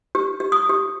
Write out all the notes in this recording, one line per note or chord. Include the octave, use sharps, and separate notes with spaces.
G4
G4
D#6
G4